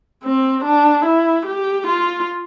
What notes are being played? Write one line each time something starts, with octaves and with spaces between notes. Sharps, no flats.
C4
D4
E4
G4
F4